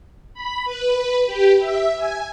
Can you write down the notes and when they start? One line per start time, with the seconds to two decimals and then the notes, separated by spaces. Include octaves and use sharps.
0.34 B5
0.65 B4
1.26 G4
1.59 E5
1.97 G#5